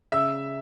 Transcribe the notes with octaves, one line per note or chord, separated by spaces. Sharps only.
C#3 E5 E6